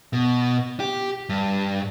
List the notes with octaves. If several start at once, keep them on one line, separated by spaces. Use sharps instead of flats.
B2
G4
G2